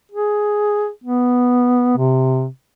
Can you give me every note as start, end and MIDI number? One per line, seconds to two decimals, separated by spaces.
0.12 0.89 68
1.04 1.93 59
1.97 2.47 48